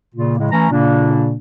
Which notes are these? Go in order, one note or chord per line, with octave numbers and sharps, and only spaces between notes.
A#2 C#3 A#3 F4
A2 C#3 G#3
E3 A3 C#4 A#5
A#2 C#3 A#3 D4